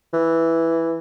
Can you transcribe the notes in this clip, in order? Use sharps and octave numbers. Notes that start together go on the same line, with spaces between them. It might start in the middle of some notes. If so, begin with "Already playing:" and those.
E3